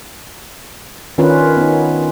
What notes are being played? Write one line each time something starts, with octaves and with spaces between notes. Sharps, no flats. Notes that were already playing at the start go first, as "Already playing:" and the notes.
D#3 C#4 D4 F4 A#4 B4
B3 D#4